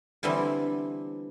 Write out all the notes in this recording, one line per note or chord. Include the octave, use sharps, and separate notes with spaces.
D3 E3 G3 B3 C4